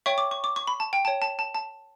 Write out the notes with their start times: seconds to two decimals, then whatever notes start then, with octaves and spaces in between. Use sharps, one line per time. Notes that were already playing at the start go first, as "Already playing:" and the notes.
0.06 C#5 E5 G5 C#6
0.18 D6
0.31 C#6
0.44 D6
0.56 C#6
0.67 B5
0.80 A5
0.93 G5
1.05 C#5 G5 A5
1.22 A5
1.39 A5
1.55 A5